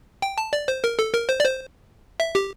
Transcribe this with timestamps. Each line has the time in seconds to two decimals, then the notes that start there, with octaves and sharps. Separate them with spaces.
0.22 G5
0.38 A5
0.53 D5
0.68 C5
0.84 A#4
0.99 A4
1.14 A#4
1.29 C5
1.40 D5
1.44 C5
2.20 E5
2.35 G4